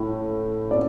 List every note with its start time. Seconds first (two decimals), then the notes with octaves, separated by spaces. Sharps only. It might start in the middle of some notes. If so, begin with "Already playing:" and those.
Already playing: A2
0.71 D5